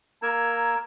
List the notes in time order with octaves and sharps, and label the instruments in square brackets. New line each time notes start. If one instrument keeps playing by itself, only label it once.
[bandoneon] A#3 A#4 E6 [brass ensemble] A#5 [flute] G#6